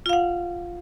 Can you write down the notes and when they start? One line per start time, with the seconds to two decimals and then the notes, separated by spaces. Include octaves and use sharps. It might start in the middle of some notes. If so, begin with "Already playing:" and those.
0.06 F4
0.09 F5
0.13 F#5